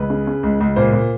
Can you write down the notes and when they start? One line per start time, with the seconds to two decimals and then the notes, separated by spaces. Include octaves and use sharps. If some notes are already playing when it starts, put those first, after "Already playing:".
Already playing: C#2 B4
0.10 C#3
0.27 C#3
0.43 C#2
0.61 C#2
0.76 A#2 C5
0.93 A#2